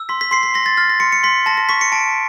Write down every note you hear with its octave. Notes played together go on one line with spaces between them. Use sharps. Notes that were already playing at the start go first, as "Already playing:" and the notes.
Already playing: E6
C6 B6
B6
C6 C7
B6
C6 A#6
A6
F6 A6
A#6
C6 C#7
C#7
C6 B6
A5 A#6
A#6
C#6 B6
C#7
A5 D7